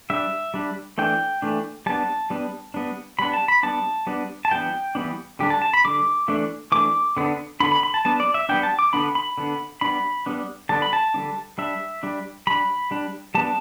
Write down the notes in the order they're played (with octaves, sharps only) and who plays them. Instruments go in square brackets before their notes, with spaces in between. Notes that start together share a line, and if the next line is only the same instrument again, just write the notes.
[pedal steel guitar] G3 D4 E5
G3 D4
E3 A3 D4 G5
E3 A3 D4
G3 B3 D4 A5
G3 B3 D4
G3 B3 D4
G3 B3 D4 B5
A5
B5
G3 B3 D4 A5
G3 B3 D4
A5
E3 G3 B3 D4 G5
E3 G3 B3 D4
D3 G3 D4 G4
A5
A5
B5
D3 G3 D4 D6
E3 A3 D4
E3 A3 D4 D6
D3 B3 D4
D3 B3 D4 B5
B5
B5
A5
G3 B3 D4 A5
D5
E5
G3 B3 D4 G5
A5
D6
D3 B3 D4 B5
B5
D3 B3 D4
G3 B3 D4 B5
G3 B3 D4
D3 G3 B3 D4 A5
B5
A5
D3 G3 B3 D4
G3 D4 E5
G3 D4
G3 D4 B5
G3 D4
G3 B3 D4 A5